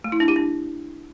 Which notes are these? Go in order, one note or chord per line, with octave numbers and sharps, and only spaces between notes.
A3
E4
D4
G4
D4